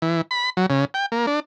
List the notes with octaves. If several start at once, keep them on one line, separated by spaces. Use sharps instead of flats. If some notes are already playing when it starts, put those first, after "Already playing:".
E3
B5
F#3
C#3
G5
A#3
D4